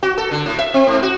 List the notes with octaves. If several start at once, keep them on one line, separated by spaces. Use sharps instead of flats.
F#4
A4
D3
A2
E5
C4
G#2
F#4